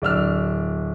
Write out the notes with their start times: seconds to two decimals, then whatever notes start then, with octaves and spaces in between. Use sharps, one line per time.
0.02 D1 D5 E6 F6